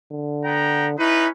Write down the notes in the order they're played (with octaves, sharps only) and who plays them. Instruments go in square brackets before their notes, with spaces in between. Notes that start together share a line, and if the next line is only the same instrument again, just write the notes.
[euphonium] D3
[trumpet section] B3 G5 A#5
[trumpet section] C#4 D#4 B4 [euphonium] E4